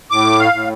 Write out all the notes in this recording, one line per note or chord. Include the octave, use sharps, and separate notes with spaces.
A2 D6
F5
A2